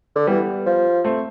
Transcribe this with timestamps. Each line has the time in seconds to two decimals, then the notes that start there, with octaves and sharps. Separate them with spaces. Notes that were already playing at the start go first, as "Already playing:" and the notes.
0.16 D3
0.27 E3 G3 B3
0.66 F3
1.04 A3 C4